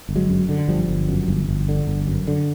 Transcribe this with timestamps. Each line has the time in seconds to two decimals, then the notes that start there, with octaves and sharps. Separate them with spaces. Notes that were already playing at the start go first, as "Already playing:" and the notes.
0.09 G1
0.16 F#3 G#3
0.29 F#2
0.49 D3
0.68 G1 F3 G3
0.89 G1
1.09 F#2
1.28 G1
1.49 G1
1.69 D3
1.87 G1
2.07 F#2
2.27 D3